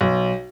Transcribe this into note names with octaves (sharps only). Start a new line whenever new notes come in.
B1